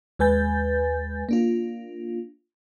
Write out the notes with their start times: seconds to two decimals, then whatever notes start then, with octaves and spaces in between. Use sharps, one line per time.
0.19 D#2 G#3 B4 G#5 G6 A6
1.29 A#3 D4 F4